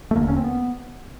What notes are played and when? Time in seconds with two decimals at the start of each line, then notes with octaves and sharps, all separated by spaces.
0.11 A3
0.16 E1 D#2 D3 A#3
0.28 C#4
0.37 C4
0.44 B3